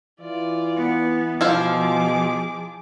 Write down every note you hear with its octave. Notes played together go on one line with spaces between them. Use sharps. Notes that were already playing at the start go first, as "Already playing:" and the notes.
E3 F4 D5
B3
B2 F3 E4 F4 G#4 C5 D6